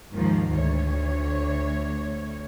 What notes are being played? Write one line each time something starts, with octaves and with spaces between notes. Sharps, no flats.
D#2 G#2 D#3 F3
D2 C#5